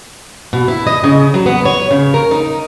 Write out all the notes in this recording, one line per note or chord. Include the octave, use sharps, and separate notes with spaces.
B2
E4
D#5
C#3
F#3
B3
C#5
C#3
A#4
D#4